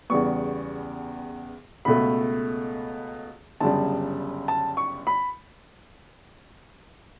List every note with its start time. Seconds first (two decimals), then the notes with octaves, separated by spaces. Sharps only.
0.10 E2 C#3 G3 B3 C#6
1.85 C#2 B2 A3 B5
3.60 G1 F#2 C#3 G3 A5
4.48 A5
4.77 C#6
5.07 B5